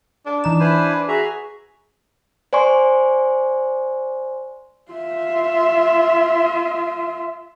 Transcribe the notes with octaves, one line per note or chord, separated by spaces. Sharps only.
D4
E3 D#4 E7
E4 B4 C5 G#5
F#4 G#4 E5 A#5
C5 D5 G#5 C6 C#6
F4 E5